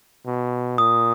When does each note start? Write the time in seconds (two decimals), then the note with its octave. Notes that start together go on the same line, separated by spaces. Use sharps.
0.26 B2
0.78 A#2 D#6